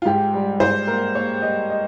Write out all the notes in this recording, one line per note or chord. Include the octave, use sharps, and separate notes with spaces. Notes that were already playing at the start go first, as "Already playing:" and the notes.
F4
G#2 G4
G3
G#2 C5
A#3 A#4
A#3 C#5
G3 D#5
D#5